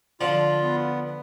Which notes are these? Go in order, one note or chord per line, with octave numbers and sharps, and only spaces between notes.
D3 F3 F4
B3
B3